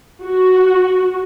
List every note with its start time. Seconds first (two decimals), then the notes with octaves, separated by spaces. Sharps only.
0.24 F#4